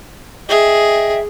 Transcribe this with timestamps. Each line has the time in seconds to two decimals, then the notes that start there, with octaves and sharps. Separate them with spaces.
0.49 G#4 D#5 E5 G5